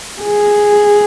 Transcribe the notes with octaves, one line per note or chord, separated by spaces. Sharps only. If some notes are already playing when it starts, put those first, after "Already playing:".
G#4